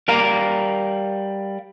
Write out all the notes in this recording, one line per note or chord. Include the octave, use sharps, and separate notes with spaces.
G3 A#4 F5 A#5